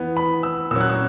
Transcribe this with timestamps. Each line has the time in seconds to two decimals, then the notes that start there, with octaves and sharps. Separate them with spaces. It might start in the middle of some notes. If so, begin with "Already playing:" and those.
Already playing: E3 B3
0.17 B5
0.43 E6
0.71 A#2 F#3 A#3 C#4 E6
0.81 F#6
0.90 E6